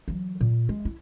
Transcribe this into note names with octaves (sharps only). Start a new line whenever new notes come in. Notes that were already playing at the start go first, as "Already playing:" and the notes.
E3 F#3
A#2
G#3
E4